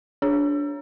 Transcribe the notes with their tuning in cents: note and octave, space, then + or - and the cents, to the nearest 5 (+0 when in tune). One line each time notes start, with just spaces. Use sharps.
D4 -20 G#4 +0 C#5 +0